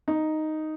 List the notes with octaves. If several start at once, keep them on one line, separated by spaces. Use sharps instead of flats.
D#4